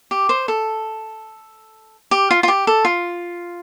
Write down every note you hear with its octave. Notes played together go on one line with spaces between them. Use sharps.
G4
C5
A4
G4
F4
F4
G4
A4
F4